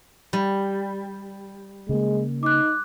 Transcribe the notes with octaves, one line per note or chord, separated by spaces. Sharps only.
G3
C#3 G#3 A#3
D#4 D6 F#6